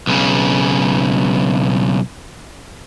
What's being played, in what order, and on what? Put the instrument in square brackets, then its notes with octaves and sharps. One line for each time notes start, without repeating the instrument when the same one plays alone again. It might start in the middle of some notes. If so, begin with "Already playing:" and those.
[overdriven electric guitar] B1 C#3